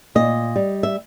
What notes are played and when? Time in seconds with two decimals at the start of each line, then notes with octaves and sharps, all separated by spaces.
0.15 A#2 D#5
0.56 G3
0.83 E5